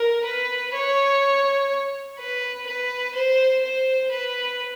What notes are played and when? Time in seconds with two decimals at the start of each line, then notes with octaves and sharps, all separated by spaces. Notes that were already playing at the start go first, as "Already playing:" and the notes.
Already playing: A#4
0.25 B4
0.74 C#5
2.19 B4
2.67 B4
3.15 C5
3.64 C5
4.11 B4